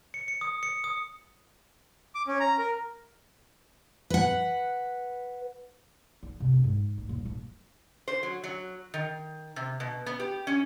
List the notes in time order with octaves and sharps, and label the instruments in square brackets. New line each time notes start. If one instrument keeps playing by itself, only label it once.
[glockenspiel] C#7
C#7
D#6
C#7
D#6
[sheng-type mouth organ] D6
C#4
A#5
A#4
[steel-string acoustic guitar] B4 F#5
[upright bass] E4
C3
C4
G#2
D2
D#1
F3
[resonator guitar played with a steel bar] C5
F#3
F#3
D#3
C3
B2
B3
G4
C#4